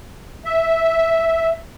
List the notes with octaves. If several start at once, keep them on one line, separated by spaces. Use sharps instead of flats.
E5